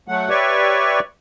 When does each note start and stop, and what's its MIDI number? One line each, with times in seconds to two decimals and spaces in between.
0.08 0.29 54
0.08 0.29 57
0.08 0.29 78
0.29 1.00 67
0.29 1.00 71
0.29 1.00 73
0.29 1.00 74
0.29 1.00 76
0.29 1.00 85